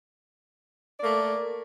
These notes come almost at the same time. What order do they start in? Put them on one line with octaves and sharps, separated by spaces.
D5 A#3 A3